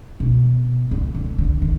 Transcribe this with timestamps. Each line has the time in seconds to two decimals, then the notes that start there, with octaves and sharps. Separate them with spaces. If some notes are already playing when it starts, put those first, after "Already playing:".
0.20 B2
0.91 D3
1.14 D3
1.38 D3
1.62 D#3